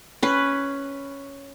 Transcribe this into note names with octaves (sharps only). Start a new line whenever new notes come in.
C#4 B4